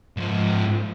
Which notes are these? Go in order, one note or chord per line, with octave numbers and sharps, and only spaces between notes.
G#2 F3